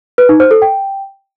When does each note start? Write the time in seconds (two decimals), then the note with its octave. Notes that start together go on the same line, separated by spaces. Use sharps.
0.18 B4
0.29 D#4
0.40 C5
0.51 A4
0.62 G5